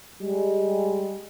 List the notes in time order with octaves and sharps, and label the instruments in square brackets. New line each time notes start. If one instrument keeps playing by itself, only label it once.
[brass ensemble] G3 G#3